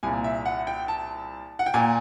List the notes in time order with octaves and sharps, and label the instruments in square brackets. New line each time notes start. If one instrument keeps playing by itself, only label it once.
[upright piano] C2 A#2 G#5
E5
F#5
G5
A5
F#5
G5
A#2 G#5